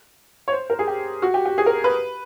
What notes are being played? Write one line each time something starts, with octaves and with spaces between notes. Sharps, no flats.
C#5
C5
A#4
G#4
G4
F#4
G4
G4
G#4
A#4
B4